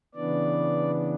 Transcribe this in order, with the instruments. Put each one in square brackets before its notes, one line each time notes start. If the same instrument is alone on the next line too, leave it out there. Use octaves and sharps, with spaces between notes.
[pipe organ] C#3 E3 B3 D4 D5